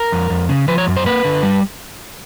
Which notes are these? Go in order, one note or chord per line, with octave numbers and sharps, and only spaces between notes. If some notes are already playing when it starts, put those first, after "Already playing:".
Already playing: A#4
F2
F2
C#3
F3 B4
C#5
F#2
C5
A#3 B4
D3
G3